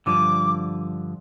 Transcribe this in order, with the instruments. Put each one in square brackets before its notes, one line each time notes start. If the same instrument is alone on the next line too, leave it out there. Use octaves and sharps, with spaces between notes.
[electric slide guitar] G2 D3 F3 [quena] D6